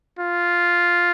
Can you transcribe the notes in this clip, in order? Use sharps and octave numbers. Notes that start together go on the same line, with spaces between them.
F4